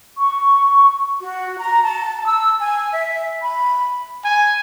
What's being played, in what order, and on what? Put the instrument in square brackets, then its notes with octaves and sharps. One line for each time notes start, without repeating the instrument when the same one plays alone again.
[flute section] C#6
F#4
A#5
A5
E6
G#5
E5
B5
[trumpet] G#5